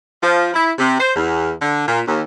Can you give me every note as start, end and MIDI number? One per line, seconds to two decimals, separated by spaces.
0.23 0.51 53
0.54 0.71 64
0.78 0.97 48
1.00 1.11 72
1.16 1.52 40
1.62 1.88 50
1.88 2.01 46
2.08 2.23 39